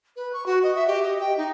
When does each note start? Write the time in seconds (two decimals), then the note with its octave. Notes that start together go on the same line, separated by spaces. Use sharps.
0.16 B4
0.33 C#6
0.46 F#4
0.63 D#5
0.75 E5
0.87 G4
1.03 D#5
1.20 G5
1.37 D#4